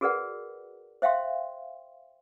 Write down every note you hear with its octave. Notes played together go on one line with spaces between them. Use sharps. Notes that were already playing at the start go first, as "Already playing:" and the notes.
F#4 G#4 A#4 B4 D5 F#5
C5 E5 F5 G5 C6